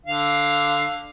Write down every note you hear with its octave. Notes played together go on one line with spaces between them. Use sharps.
D3 F5